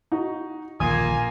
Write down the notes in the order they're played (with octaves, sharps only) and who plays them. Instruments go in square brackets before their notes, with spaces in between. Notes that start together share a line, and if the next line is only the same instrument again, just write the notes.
[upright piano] D#4 F#4
[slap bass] D#1 A#1 D3 [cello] A#3 F4 [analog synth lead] G#5 [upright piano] D#6